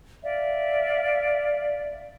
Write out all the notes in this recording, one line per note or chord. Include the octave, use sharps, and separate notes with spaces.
D5 E5 F5